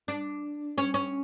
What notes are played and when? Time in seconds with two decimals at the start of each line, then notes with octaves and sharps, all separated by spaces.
0.08 D4
0.78 C#4
0.94 C#4